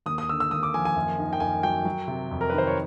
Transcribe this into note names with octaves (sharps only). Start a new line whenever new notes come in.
D#2 D#6
D#6
D3 E6
E6
D#2 D#6
D6
F3 G#5
G#5
F#2
D#3
G5
F#2 G#5
F#3 G5
F#3
C3
F2
A#4
B4
D#3
C5
C#5